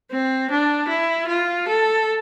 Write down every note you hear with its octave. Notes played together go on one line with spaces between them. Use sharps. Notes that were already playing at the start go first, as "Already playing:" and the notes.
C4
D4
E4
F4
A4